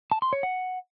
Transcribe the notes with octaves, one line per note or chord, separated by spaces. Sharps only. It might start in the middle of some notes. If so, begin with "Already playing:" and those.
A5
C6
C#5
F#5